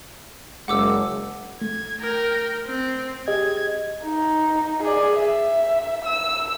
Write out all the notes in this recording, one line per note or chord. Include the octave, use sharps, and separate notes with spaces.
F#1 G#3 F#5 D6 E6
A3 G#6
A#4 G5
C4
G4 G#4 D#5 G#6
D#4
G#4 D5
E5
E6